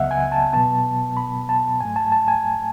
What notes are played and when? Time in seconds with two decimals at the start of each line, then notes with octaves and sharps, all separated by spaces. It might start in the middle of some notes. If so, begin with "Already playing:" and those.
Already playing: C#2 C#3 F#3 B3 D#5 E5 F#5
0.11 G#5
0.32 A5
0.53 B2 F#3 B3 A5
1.17 B5
1.49 A5
1.80 G#2 F#3 A3 G#5
1.96 A5
2.12 A5
2.28 G#5